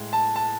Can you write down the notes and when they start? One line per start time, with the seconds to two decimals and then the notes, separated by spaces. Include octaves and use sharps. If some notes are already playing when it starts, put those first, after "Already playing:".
Already playing: A2 G#3
0.13 A5
0.36 A5